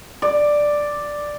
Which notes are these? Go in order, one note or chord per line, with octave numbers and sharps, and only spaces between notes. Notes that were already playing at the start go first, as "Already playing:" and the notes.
D5